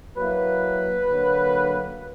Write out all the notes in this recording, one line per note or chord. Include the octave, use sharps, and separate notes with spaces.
F#3 A#3 E4 B4
D3 F#3 A#3